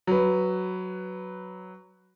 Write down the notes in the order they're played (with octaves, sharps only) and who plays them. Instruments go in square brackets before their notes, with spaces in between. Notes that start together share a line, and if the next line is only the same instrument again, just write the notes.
[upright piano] F#3 B4